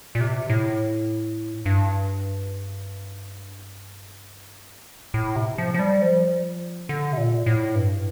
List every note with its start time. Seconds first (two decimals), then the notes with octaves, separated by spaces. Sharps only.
0.15 A#2
0.21 C3
0.50 A2
1.66 G2
5.14 A2
5.36 C3
5.58 F3
5.74 F3
5.79 G3
6.02 F3
6.89 D3
7.13 C3
7.17 A#2
7.46 A2
7.75 G2